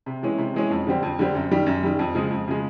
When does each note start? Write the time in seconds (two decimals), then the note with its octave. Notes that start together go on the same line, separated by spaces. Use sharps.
0.06 C3
0.23 E3 G#3 C#4
0.38 C3
0.54 E3 G#3 C#4
0.71 F2
0.87 D3 G3 C4
1.03 F2
1.19 D3 G3 C4
1.35 F#2
1.51 D#3 G3
1.66 F#2
1.83 D#3 G3
1.99 F2
2.15 C#3 F3 G#3
2.31 F2
2.47 C#3 F3 G#3